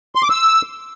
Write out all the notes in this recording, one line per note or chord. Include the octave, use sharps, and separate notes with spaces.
C6
D6
E6